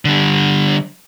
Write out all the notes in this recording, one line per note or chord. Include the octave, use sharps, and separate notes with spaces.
D3 G3